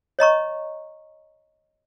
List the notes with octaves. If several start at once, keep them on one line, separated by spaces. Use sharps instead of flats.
C#5 D#5 A#5 C#6